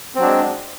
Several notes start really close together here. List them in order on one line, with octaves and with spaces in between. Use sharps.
C4 F#3 D4 G#3